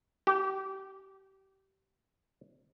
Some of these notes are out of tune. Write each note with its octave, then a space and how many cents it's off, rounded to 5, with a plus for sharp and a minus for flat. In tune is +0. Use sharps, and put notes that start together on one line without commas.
G4 -25